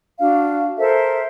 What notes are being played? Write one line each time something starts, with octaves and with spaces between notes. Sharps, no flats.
D4 F#4 F5
A4 A#4 C5 E5